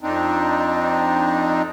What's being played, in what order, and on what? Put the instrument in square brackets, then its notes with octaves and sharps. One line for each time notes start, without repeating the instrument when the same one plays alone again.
[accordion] F2 C4 D4 D#4